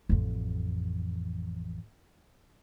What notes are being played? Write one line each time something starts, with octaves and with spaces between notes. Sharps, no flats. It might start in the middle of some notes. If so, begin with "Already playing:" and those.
A1 F2